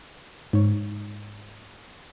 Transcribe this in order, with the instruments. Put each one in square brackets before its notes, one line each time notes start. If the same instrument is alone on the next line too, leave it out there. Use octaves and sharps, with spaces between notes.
[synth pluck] G#2 C#5